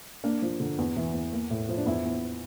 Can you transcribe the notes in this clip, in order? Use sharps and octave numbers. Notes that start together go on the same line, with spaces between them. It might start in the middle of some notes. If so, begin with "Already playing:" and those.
A#3 D4
F3
D3
E2
E3
E2
A#3
A2
F3
D4
E2 E4
E2